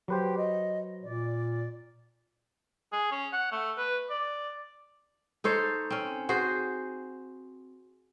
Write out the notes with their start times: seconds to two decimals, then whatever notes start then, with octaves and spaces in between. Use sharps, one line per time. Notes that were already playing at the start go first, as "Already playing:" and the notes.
0.08 F#3 G4 B4 C5
0.37 D#5
1.03 A#2 D5
2.93 G#4
3.12 C#4
3.33 F#5
3.52 A3
3.78 B4
4.10 D5
5.44 D#4 A4 C5 C#5
5.90 C4 C#4
6.29 F#4 G#4 C5